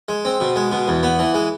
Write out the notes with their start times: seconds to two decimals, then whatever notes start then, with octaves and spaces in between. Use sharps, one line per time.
0.09 G#3
0.25 C4
0.40 B2
0.56 G#3
0.72 B2
0.88 E2
1.03 B3
1.19 E3
1.34 G#3